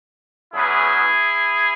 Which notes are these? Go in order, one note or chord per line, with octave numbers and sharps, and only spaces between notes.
E2 C#3 F#3 B3 E4 G#4